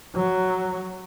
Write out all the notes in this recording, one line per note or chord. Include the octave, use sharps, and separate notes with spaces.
F#3